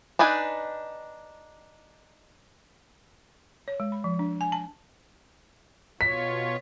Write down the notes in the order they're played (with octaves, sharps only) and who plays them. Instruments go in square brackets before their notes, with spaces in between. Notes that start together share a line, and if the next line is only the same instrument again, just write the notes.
[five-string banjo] D4 D#4 B4 G#5
[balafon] C#5
G#3
B5
F3
D4
G#5
A5
[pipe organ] B2 F4 C#5 [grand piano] B6